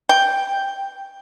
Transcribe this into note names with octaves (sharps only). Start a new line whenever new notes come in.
G5